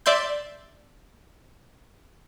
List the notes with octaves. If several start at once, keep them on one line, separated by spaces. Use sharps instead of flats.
D5 E5 C6 G6